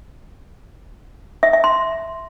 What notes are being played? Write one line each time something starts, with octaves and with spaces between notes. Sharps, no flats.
E5
E5
C6